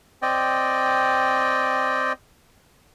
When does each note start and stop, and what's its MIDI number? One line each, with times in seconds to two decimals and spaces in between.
0.22 2.13 60
0.22 2.13 74
0.22 2.13 75
0.22 2.13 79